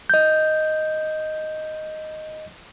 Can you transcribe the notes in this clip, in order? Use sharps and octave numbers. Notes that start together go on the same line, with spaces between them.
D#5 G6